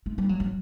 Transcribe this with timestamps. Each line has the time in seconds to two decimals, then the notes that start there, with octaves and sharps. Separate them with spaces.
0.06 G#3
0.18 G3
0.29 F#3
0.40 F#3